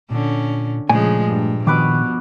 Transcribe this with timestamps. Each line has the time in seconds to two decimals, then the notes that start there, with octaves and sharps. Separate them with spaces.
0.10 A#2 D3 C#4
0.89 A#2 C#3 F3 G#3 A3 D5 G#5
1.27 G2
1.67 B2 D#3 F3 B4 D6